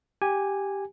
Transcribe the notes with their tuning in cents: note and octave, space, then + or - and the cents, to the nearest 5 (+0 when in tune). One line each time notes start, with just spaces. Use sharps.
G4 +0 G#5 -10